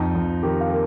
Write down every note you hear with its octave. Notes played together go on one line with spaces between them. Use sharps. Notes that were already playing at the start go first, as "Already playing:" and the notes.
Already playing: F2 D#4
F2
D#3 G4
F5
A#3